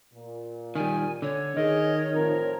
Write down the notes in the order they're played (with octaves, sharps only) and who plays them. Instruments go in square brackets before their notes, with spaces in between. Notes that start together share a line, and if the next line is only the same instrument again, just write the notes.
[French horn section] A#2
[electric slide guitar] D#3 G3 [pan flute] G#5
[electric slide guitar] D3 [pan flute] C#5
[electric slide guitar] D#3 [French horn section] G#4 [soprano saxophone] D#5
[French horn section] A2 F3 C4 [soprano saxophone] A#4